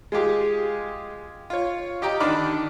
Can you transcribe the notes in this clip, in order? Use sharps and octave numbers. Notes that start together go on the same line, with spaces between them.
G#3 F4 G4 G#4
F4 C#5
G4 D#5 G5 A#5
D3 D#3 D4 B5 D6 F6